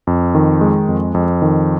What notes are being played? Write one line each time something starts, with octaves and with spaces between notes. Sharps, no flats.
F2
D#3
G#3
F2
F2
D#3